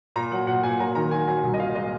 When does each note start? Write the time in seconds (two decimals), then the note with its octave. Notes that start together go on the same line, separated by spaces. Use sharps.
0.16 A#2 A#5
0.32 F#3 F#5
0.47 A#2 F#5
0.63 A#2 G#5
0.79 F#3 A#5
0.95 D#3 A#5
1.11 F#3 G#5
1.27 F#3 G#5
1.43 C2
1.54 D#5
1.59 A#2 F5
1.75 G#3 D#5